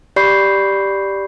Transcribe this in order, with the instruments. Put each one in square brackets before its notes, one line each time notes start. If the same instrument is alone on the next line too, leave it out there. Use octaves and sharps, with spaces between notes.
[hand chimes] G4 D5 B5 C#6 G6 C7